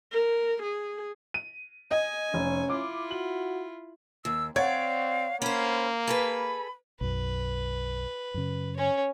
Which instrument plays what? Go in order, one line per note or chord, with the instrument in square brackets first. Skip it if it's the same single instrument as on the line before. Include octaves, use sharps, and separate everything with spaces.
[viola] A#4
G#4
[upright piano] D#7
[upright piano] D#5 [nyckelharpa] G#5
[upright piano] F1 [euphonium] C#4
[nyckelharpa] E4 F4 [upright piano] D6
[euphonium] F#4 [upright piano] F#7
[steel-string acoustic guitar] D#2 [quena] E6
[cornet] C4 [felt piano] C#5 F#5 G#6 [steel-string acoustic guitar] D5 [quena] F5
[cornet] A#3 [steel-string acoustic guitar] C#4 C5 [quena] B5
[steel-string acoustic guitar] G#4 A4 B4 [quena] B5
[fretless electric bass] B1 F#2 [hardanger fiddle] B4
[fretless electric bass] F#2 C#3
[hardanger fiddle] C#4 C#5